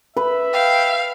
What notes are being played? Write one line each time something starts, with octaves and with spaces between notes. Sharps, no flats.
B4 E5
F5 G5